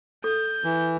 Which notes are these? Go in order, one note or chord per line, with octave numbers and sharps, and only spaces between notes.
A4 G6
E3